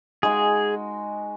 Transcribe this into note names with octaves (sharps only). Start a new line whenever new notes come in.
G#3 D#4 F#4 G#4